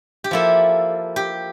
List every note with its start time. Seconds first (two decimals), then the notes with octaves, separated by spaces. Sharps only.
0.24 G4
0.31 F3 A#3 E4 A4
1.16 G4